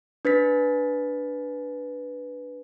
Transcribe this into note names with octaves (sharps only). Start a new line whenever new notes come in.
D4 B4 A6 B6